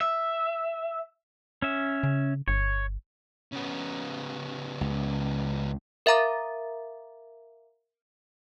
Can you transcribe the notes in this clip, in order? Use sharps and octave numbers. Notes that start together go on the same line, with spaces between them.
E5
C#4 E5
C#3
G1 C#5
C#3 B3
C#2
A#4 E5 F5 A#5 D6 A6